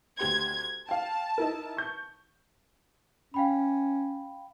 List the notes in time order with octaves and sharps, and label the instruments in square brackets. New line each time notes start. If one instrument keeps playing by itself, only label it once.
[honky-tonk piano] D2 G4 C6 [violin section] G#6
[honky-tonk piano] F5 G5 [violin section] A5
[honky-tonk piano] D#4 E4 A#4
C#6 G6
[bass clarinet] C#4 [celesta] F5 G5 B5